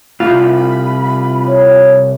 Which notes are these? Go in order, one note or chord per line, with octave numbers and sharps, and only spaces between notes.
C2 G#2 F4 B5
C#5